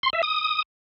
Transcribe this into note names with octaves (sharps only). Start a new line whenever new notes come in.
C6
E5
D#6